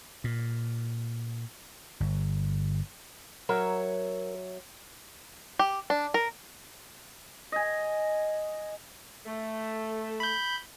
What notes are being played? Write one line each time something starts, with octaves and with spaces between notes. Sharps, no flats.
A#2
G1
F#3 A#4 C#5 E5
G4
D4
A#4
D#5 G#5
A3
B5 G6